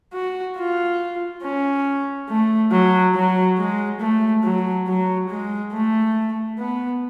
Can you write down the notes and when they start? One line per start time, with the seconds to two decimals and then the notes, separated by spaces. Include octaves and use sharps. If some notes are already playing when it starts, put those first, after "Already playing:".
0.14 F#4
0.57 F4
1.43 C#4
2.29 A3
2.72 F#3
3.15 F#3
3.58 G#3
4.00 A3
4.44 F#3
4.87 F#3
5.29 G#3
5.73 A3
6.59 B3